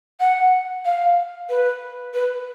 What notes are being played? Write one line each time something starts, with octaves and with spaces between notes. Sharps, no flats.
F#5
F5
B4
B4